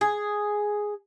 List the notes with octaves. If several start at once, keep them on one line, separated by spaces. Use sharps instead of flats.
G#4